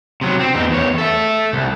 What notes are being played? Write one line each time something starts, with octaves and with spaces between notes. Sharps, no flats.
C3 F#3
C4
E2 D#4
E2 C#5
A4 E5
C2